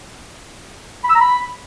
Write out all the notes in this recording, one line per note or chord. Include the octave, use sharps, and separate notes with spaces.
B5
E6
A#5
B5